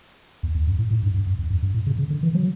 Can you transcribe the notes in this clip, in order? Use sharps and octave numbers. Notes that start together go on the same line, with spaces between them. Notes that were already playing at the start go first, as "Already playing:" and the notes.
E2
E2
F#2
A2
A2
G2
G2
F#2
E2
F#2
G2
A2
C#3
C#3
D3
E3
F#3